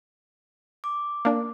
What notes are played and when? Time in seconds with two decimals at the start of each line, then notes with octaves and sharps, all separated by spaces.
0.84 D6
1.25 A#3 D4